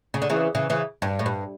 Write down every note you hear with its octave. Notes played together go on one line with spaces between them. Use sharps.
C#3
D3
C#3 E3
C#3 E3
C#3 E3
G2
A2
G2